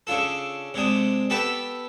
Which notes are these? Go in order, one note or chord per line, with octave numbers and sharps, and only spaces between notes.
C#3 D4 F4 A4
C3 G#3 D4 D#6
B3 G4 A4 B4 A5 B5